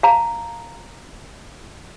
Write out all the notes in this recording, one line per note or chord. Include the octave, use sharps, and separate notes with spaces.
F5 A5 A#5